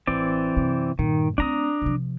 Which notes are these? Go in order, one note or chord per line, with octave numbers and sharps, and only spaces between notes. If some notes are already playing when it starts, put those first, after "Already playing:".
A1 E3 C4 D5
F#2 C3
G2 A#2 D#3
A3 C4 D4 A#5 D#6
C3 F3